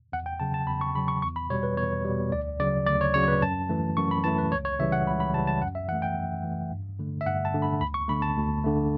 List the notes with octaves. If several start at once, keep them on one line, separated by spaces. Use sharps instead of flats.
E2 F#5
G5
C#3 F#3 A5
A5
E2 B5
C#6
C#3 F#3 B5
C#6
E2 C#6
B5
B2 G3 C#5
B4
E2 C#5
B2 G3
D2 D5
C#3 F#3 D5
D2 D5
C#5
C#3 F#3 C#5
B4
F#2 A5
E3 A3
F#2 C#6
B5
E3 A3 A5
B4
C#2 C#5
C#5
C#3 E3 G3 E5
F#5
C#2 B5
B5
C#3 E3 G3 A5
A5
F#2 F#5
E5
E3 A3 F#5
G5
F#2
E3 A3
G2
D3 A3
E5
G2 F#5
A5
D3 A3
B5
D2 B5
C#6
D3 A3 B5
A5
D2
D3 A3